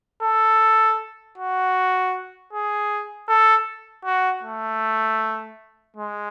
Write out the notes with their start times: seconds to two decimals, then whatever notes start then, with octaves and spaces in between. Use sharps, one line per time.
0.22 A4
1.38 F#4
2.53 G#4
3.28 A4
4.05 F#4
4.43 A3
5.96 G#3